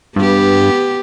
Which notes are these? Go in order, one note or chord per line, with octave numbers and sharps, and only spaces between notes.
G2 B3 G4